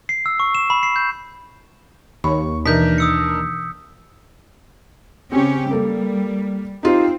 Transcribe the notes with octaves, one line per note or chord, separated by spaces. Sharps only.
C7
E6
C#6
E7
B5
C7
G6
D#2 C#5 B5 C#6
B2 E3 D4 D#4 A#4 G6 B6
D#6 E6 C#7
C#3 C4 C#4 G4
G3 A#3 A4 A#4
C4 D#4 F4 G4